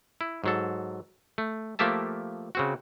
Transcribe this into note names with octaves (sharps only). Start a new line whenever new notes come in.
E4
G#2 F#3 A4
A3
F3 A3 A#3 G4 E5 A5
C#3 C4 F#4